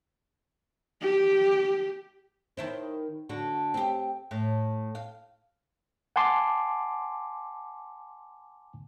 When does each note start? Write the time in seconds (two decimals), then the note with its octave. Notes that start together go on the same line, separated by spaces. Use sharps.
1.02 G4
2.57 D#3 E4 C5
3.29 D3 F#4
3.74 C4 G4
4.31 A2
4.95 F5
6.16 F#5 G#5 A5 C6 D6